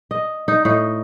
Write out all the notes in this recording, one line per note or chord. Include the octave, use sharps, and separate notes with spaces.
D#5
D#4
A2 D#4